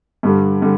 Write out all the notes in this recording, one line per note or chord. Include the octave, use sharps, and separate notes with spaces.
G2 D3 G3
D3 G3